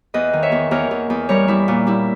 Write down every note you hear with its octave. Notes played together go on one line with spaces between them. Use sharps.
E2 B4 D#5
D#3
C#5 E5
E2
E2 A#4 C#5
E2
E2
G3 A#4 C#5
G3 E4
A#2
G3 E4